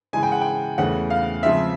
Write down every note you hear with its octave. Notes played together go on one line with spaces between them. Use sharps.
C#3 E3 G#3 G#5
G5
F#5
G5
E2 C#3 E3 A3 C#4 F#5
F5
C#3 F3 G#3 C4 E5